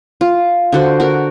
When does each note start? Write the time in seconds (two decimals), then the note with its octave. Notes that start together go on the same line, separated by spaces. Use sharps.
0.21 F4
0.72 D3 F#4 C5
1.00 F#4 A#4